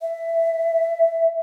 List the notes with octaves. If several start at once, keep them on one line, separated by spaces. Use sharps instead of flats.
E5